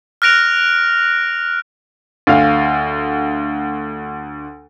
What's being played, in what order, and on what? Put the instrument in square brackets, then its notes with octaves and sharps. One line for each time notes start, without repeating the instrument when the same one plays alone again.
[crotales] F6 F#6 A#6 D7 F7
[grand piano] D2 F5